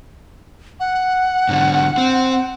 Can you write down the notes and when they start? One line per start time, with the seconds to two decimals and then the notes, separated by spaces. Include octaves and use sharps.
0.80 F#5
1.49 G#2 D3
1.98 C4